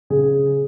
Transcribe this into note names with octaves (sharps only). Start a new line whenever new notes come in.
C#3 G#4